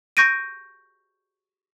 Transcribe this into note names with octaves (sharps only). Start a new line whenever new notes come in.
C#6 G6 A#6 D7 D#7